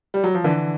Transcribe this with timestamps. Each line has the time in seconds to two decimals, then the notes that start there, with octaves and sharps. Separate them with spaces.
0.14 G3
0.24 F#3
0.34 F3
0.44 D3 E3